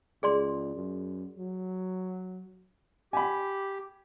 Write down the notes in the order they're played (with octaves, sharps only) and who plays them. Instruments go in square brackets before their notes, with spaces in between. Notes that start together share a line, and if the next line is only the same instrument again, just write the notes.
[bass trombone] C#2 [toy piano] G#4 D5 C6
[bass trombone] F#2
F#3
[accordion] G4 [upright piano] G#5 B5